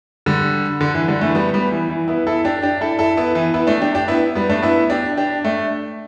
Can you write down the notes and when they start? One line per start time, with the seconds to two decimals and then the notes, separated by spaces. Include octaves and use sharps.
0.26 D3 G3
0.81 D3
0.95 E3
1.08 D3 G3
1.21 E3 A3
1.35 G3 B3
1.54 G3 B3
1.72 E3
1.90 E3
2.08 B3 E4
2.27 E4 A4
2.44 D4 G4
2.62 D4 G4
2.81 E4 A4
2.99 E4 A4
3.17 B3 E4
3.35 E3
3.54 B3 E4
3.67 A3 D4
3.81 D4 G4
3.95 D4 G4
4.08 B3 E4
4.35 G3 B3
4.49 A3 D4
4.63 B3 E4
4.90 D4 G4
5.17 D4 G4
5.45 A3 D4